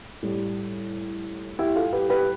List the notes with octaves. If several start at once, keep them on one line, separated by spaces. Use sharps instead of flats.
A2 G3
E4 G4
F4 A4
G4 B4
G4 B4